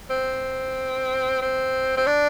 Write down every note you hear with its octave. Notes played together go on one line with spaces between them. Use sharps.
C4
C4
C4
D4